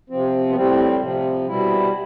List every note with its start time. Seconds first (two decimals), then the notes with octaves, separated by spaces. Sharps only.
0.10 C3 F3 C4
0.49 B3
0.55 A2 G3 C4
1.01 C3 F3
1.47 B2 G3 E4